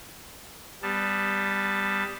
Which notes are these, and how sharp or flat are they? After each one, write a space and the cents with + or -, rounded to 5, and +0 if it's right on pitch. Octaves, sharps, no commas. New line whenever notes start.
G3 +10 B3 +15 A5 +0